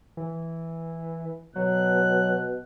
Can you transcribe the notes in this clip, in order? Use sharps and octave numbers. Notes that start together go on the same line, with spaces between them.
E3
B2 F#3 F#6